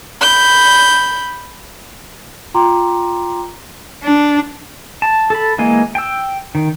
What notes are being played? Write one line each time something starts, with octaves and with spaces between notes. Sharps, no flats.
B5 G6
F4 G5 A#5 C6 D6
D4
A5
A4 B5
E3 G#3 A#3 G#5
G5 E6
D#3